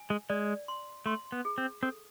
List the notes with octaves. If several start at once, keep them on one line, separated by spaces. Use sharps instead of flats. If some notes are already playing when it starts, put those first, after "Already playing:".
Already playing: G#5
G#3
G#3 D5
C6
A3 C6
B3
G#4
C4
C4 A4